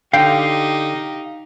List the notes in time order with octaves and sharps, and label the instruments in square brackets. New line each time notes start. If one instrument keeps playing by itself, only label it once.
[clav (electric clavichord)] D3 [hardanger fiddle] D#4 G4 [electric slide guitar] F5 [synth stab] G5